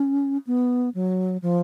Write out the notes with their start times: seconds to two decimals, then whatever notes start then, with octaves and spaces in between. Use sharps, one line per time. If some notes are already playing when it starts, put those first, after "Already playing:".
Already playing: C#4
0.47 B3
0.95 F#3
1.42 F3